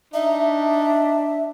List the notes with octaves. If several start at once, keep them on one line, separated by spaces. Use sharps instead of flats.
D4 D#4 E5